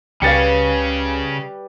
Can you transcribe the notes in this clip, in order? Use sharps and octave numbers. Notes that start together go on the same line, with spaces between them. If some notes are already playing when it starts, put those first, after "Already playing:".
C#2 C#3 G3 C#4 B4 F5 A6 C#7